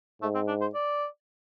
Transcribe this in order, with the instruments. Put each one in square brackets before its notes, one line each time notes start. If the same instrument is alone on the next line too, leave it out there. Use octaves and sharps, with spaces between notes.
[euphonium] G#2 [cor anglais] A3
[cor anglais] C4
D4
C5
D5